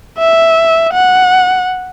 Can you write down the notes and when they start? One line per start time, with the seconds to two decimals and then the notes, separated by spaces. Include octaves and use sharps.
0.19 E5
0.94 F#5